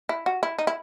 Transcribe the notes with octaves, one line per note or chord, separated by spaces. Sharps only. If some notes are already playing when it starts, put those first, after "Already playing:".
E4
F#4
E4
D#4
E4